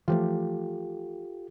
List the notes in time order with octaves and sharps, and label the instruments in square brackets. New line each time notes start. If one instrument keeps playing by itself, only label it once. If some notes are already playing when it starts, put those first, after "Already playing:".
[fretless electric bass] E3 F3 A3 [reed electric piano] F4 G4 A4